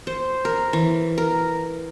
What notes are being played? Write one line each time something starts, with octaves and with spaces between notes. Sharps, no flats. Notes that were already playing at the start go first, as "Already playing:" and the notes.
C5
A#4
E3
A#4